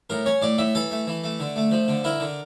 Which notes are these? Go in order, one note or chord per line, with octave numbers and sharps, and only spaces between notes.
A2 A#4
C#4 C#5
A2 D5
A2 E5
E3 A4
A3
E3
A3
D3
A3
F3
D3
E4 A#4
D3